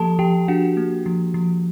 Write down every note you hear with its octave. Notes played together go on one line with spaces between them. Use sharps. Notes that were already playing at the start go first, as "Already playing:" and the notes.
Already playing: F3 A#3 G4 A4 A5
F3 G4 G5
D4 F#4 F#5
A#3
F3
F3